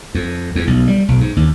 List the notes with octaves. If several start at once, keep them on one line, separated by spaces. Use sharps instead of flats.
F2
E2
B1
G3
B1
G#2
D#2